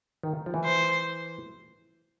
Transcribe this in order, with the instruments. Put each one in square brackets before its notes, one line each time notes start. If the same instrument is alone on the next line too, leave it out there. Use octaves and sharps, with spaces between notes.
[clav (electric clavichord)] D#3
F3
E3
[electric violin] C5